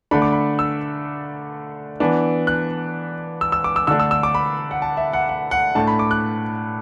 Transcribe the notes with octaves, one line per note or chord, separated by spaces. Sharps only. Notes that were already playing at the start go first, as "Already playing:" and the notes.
D3 A3 D4 B5
D6
B5
E6
E3 B3 D4
F#6
E6
E6
D6
E6
D3 A3 D4 E6
E6
E6
D6
B5
F#5
A5
E5
F#5
F#5
F#5
A2 A3 D4 A5
B5
D6
F#6